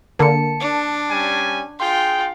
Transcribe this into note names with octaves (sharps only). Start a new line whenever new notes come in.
D3 A#3 A5 C#7
D4
G3 C#4 G#5
F4 G#4 G5 C6